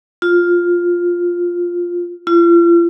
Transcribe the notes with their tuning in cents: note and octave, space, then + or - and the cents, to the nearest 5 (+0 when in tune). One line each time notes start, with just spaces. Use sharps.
F4 +5
F4 -40